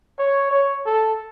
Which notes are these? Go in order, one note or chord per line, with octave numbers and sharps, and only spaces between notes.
C#5
C#5
A4